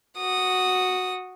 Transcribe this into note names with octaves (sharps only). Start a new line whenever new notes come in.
F#4 D#6